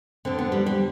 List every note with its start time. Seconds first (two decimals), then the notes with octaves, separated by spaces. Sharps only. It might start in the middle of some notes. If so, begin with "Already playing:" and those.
0.25 F2 D3 C4
0.39 B3
0.52 G3
0.66 G3